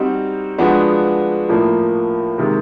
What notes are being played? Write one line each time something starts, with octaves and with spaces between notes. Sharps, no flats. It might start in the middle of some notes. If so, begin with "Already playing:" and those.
Already playing: G3 C4 D#4 F#4
F3 G#3 B3 D4 F#4
A2 F3 A#3
C3 D#3 G#3